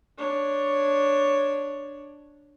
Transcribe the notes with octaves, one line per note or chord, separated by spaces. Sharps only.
D4 C#5